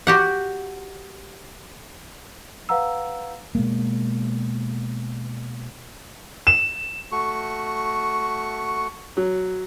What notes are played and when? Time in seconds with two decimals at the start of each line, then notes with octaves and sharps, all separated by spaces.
0.07 F#4 G4 F#5
2.69 B4 F5 F#5 A#5 E6
3.55 B2 G#3 A#3
6.47 E7
7.12 A3 F#4 C#6
9.17 F#3